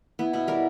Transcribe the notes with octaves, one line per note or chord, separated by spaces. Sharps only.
B3 E4
B2 E4
G3 A#4